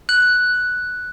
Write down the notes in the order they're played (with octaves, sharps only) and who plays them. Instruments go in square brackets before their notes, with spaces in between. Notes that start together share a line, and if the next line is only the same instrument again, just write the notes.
[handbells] F#6